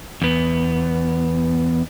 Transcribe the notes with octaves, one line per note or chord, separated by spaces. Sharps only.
E2 B3